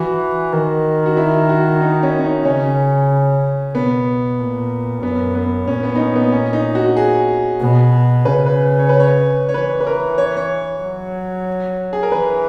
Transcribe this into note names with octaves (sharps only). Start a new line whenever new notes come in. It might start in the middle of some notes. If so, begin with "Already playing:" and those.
Already playing: E3 F#4
D#3
F#4
E4
F#4
D#4
C#4
C#4
D#4
C#3 C#4
B2 B3
A#2
F#2 B3
B3
A#2 C#4
B3
D#4
C#4
B3
C#4
D#4
F#4
F#4
G#4
B2
C#3 B4
B4
C#5
B4
C#5
C#5
E3 B4
B4
A#4
C#5
C#5
F#3
G#4
A#4
E3 B4